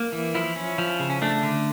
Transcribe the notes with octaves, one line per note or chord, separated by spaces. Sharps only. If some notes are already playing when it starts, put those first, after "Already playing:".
Already playing: A#3
E3
F3 E4
C#4
F3
C#3
C#4
A3 D4
D3